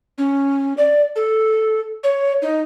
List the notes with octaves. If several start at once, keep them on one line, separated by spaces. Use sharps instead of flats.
C#4
D5
A4
C#5
D#4